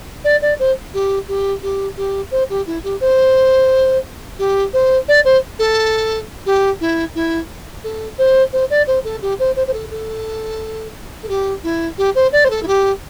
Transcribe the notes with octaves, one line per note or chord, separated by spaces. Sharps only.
D5
D5
C5
G4
G4
G4
G4
C5
G4
E4
G4
C5
G4
C5
D5
C5
A4
G4
E4
E4
A4
C5
C5
D5
C5
A4
G4
C5
C5
C5
A4
A4
A4
G4
E4
G4
C5
D5
C5
A4
E4
G4